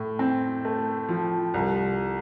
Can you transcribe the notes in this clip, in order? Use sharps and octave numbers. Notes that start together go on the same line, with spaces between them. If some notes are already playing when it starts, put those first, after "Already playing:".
Already playing: A2
C4
A3
F3
C2